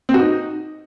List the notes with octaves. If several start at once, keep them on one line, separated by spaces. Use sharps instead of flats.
C4
F#4
D#4